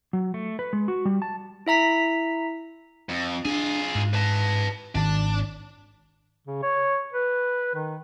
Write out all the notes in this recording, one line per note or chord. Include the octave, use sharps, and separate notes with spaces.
F#3
A3
B4
G#3
F#4
G3
A5
E4 E5 A#5 B6
F2
D4 F4 G#4
G#2
B4 A5
G#1 D#3 D4
C#3
C#5
B4
D#3